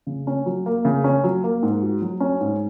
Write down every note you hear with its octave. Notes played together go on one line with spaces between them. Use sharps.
C#3
C#4
F#3
A#3
C#3
C#4
F#3
A#3
G#2
F#4
F#3
C#4
G#2